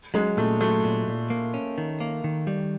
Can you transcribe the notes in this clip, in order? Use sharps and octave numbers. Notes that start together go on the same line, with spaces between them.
F#3 G#3
A#2 A3
F#3 A3
A#2
A#2
A#3
C#4
D#3
A#3
D#3
G3